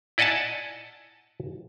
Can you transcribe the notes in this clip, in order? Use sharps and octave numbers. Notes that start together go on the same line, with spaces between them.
E4 D5 D#5 F#5 G#5 A5